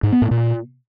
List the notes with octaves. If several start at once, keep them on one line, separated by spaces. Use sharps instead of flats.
G#2
B3
A2
A#2